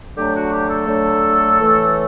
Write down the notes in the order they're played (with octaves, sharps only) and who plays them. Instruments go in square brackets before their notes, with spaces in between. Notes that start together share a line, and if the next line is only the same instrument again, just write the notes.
[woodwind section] D3 F#3 A3 D4 G4
F#4
G4
A4
D3 F#3 A3 D4
A2 E3 A3